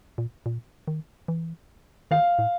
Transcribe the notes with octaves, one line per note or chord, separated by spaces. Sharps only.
A#2
A#2
D#3
E3
D#3 F5
A2